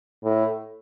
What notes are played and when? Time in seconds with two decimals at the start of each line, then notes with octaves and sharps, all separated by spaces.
0.25 A2